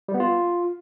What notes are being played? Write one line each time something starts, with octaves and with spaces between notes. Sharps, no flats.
G3
B3
F4